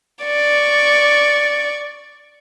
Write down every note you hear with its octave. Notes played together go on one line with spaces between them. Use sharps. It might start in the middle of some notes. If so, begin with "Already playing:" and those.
D5 C#6